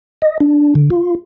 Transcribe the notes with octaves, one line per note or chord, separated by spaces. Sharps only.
D#5
D4
D3
F4